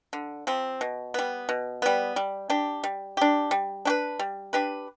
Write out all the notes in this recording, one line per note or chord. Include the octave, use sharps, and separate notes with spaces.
D3
F3 C4
B2
G3 B3
B2
G3 B3
G3
D4 G4
G3
D4 G4
G3
D4 G4 B4
G3
D4 G4 B4